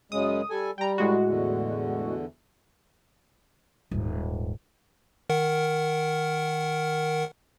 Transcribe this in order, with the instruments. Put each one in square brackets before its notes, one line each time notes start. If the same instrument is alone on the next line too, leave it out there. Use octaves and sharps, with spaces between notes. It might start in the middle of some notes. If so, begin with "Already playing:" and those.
[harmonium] F#2 C#3 G#3 [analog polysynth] D#6
[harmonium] G3 A4 G#5
[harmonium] G3 [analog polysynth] G5 A#5
[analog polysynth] A2 G#3 F#4
[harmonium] E2 D3
[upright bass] D#1 G#2
[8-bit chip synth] D#3 A#4 F#5